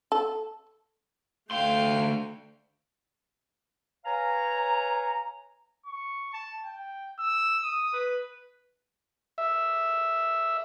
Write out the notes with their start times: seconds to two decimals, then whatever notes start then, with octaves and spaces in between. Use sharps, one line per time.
0.12 A4
1.51 D2 A3 F5 G5 C6
4.05 B4 C#5 F5 G#5 A#5
5.86 C#6
6.33 A5
6.64 G5
7.19 E6
7.63 D#6
7.93 B4
9.38 E5